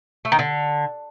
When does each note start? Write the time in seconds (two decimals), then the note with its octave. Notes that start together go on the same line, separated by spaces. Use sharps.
0.25 A3
0.32 D#3
0.39 D3